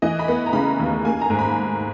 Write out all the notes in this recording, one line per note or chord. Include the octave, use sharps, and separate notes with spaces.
E3 D#5
B5
B3
A#5
C#3 B5
D#2
A#3 G#5
A#5
G#2
B5